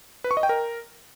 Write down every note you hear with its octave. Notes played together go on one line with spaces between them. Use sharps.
B4
C#6
D#5
G5
A#4